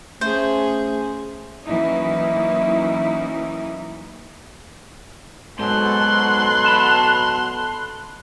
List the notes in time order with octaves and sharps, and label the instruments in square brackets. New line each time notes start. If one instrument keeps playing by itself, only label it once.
[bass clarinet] A3 [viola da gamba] C#4 G#4 [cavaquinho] C5
[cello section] E3 F#3 A#3 C#4 D#4 E4
[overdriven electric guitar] G#2 [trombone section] B2 F#3 A4 [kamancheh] C6 F#6
[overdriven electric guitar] A5 B5